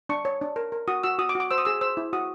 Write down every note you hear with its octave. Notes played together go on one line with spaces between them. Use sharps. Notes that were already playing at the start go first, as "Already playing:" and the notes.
D4 C#6
C#5
D4
A#4
A#4
F#4 D#6
F#4 E6
F#4 D#6
D6
F#4
D6
C5 E6
D#6
G#4 E6
C5 E6
E4
F#4 D#6